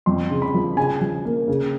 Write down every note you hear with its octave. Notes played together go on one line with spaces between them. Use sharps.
F2 C6
C#3
B5
F3
C#3 G#5
F3
A#3
C#3